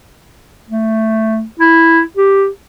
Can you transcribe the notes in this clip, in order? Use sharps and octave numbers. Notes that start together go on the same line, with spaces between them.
A3
E4
G4